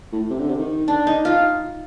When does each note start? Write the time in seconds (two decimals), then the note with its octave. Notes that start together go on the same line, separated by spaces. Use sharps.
0.12 A2
0.30 C3
0.40 D3
0.49 C3
0.59 D#3
0.88 D4
1.07 D#4
1.25 F4